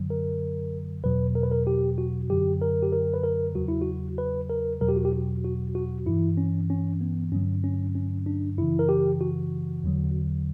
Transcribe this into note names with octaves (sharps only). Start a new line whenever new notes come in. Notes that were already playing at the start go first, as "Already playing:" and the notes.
Already playing: F#2 D3 F#3
A#4
E2 B2 F#3 B4
A#4
B4
A#4
G4
F#4
F#2 D3 F#3 G4
A#4
G4
A#4
B4
A#4
E2 C#3 F#3 F#4
E4
F#4
B4
A#4
E2 B2 F#3 A#4
G4
F#4
G4
F#4
F#4
F#4
G2 E3 E4
C#4
C#4
B3
G2 D3 F#3 C#4
C#4
C#4
D4
F#2 C#3 E3 E4
A#4
G4
F#4
E2 D3 F#3